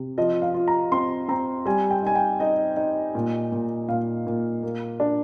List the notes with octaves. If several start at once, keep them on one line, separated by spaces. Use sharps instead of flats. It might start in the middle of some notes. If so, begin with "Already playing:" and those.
Already playing: C3
F3 D#5
F5
F4
A#5
C4 C6
C4 A#5
G3 G#5
G5
D#4 G#5
G5
D#4 D#5
D#4
A#2
A#2
A#2 F5
A#2
A#3
D4